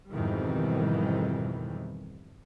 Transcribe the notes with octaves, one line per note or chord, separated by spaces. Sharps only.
F2 G#2 B2 D#3 E3 G3